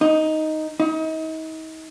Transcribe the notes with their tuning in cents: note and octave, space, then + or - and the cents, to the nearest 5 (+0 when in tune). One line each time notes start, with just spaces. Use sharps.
D#4 +5
D#4 +40